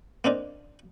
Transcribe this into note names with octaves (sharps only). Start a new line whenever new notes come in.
A#3 C4 D4 D#4